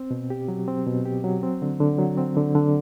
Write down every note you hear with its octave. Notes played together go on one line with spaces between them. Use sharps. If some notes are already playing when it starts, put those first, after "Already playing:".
Already playing: C4
B2
G4
F#3
C4
B2
G4
F#3
C4
D3
D3
F#3
C4
D3
D3